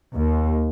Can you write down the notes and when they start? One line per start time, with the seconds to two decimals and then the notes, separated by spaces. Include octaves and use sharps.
0.13 D#2